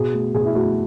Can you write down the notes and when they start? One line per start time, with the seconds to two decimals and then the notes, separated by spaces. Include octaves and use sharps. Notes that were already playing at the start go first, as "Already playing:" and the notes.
Already playing: B2 G#4
0.14 A3
0.35 B2 G#4
0.46 E4
0.55 A3 F#4